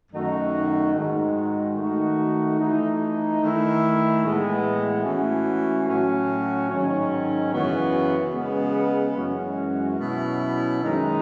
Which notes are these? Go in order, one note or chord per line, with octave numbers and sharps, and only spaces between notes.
F#2 D#3 A3 D#4 F#4
G#2 D#3 G#3 D#4 F#4
D#3 A3 D#4 F#4
E3 A3 D#4
D#3 A3 E4
A2 E3 G#3 B3
E3 A3 C#4 F#4
A2 F#3 C#4 F#4
G#2 D#3 F#3 C#4
F#2 C#3 E3 B3 F#4
C#3 G#3 B3
F#2 E3 G#3 C#4 F#4
B2 F#3 C#4 E4
F#2 D#3 G#3 D#4